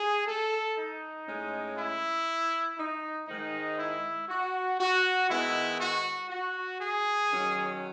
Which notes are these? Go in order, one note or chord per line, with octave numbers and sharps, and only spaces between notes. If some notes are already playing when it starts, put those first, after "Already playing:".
Already playing: G#4
A4
D#4
A2 G#3 C#4
E4
D#4
G#2 D#3 G#3 D#4
E4
F#4
F#4
D#3 G#3 B3 E4
F#4
F#4
G#4
D#3 F#3 C#4